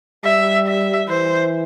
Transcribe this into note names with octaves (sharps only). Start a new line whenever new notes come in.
G3 E5
E5
E3 C5